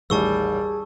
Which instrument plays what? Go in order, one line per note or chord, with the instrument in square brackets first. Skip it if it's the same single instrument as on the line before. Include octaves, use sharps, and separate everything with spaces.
[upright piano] A1 D#2 [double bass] G3 [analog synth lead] G#4 [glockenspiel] A5 C#6 E6